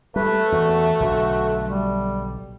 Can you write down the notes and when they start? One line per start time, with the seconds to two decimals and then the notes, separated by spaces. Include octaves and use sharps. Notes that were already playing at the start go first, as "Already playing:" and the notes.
0.16 G3 A3 B4
0.52 E2 F#4
1.00 B1 D3 F#4
1.66 G3